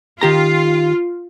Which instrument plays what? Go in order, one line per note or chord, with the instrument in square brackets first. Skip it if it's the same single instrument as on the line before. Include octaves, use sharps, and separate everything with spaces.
[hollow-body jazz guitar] D#3 G4 A#5 [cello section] F4